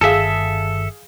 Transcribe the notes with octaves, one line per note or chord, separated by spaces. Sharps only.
G1 G2 D#3 G#4 A4 E5 F5